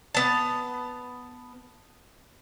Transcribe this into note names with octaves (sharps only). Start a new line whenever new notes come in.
B3 A5